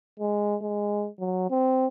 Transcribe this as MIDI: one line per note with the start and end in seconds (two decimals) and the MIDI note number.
0.20 0.56 56
0.62 1.08 56
1.20 1.50 54
1.51 1.87 60